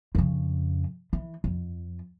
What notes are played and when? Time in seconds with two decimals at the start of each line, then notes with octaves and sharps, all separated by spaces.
0.15 F2 C#3
1.13 E3
1.44 F2